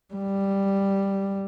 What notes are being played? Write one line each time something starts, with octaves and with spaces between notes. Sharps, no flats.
G3